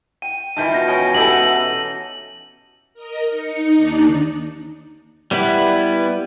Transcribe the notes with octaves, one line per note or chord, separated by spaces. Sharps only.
G5 D#7
D#3 E3 F4 A5 G6
B2 A#6
C#4 D#5 G5
E3 D#4 G4 A4 D#5 E5 F#7
A#4 D#5
D#4 C#7
D#2 D4 D#4 D5
G3 B3 E4 B4